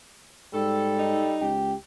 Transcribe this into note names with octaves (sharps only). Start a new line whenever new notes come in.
G#2 G3 A4
D#4
C#2 G4